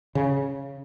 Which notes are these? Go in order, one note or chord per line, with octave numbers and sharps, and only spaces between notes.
C#3